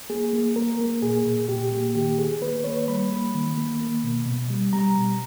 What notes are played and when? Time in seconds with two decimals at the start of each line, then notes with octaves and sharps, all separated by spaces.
0.09 A#3 G#4
0.33 A#3
0.56 A#3 A#4
0.79 A#3
1.02 A#2 G#4
1.26 A#2
1.48 A#2 G4
1.72 A#3
1.95 D#3 G4
2.18 D#3 G#4
2.42 A#3 B4
2.64 A#3 C#5
2.87 G3 B5
3.11 A#3
3.34 D#3
3.58 A#3
3.80 A#3
4.03 B2
4.26 B2
4.50 G3
4.73 G3 A#5
4.96 B2